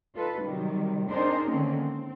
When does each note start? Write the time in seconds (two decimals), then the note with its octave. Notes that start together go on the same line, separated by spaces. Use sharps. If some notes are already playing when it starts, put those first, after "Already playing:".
0.15 D#4 F4 A4 B4
0.44 C3 D#3 F#3 G3
1.10 C4 D4 D#4 G#4 A#4 C5
1.49 D3 D#3 G#3 A#3 C4 C#4
1.79 C4